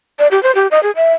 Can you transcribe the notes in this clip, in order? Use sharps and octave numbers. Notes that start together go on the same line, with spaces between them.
D5
G4
C5
G4
D#5
G#4
E5